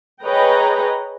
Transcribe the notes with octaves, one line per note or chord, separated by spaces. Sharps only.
G#4 B4 C#5 D#5 G5 A#5